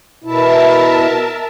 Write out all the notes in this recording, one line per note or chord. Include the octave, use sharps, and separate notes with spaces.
B2 E4 A#4 E5 A5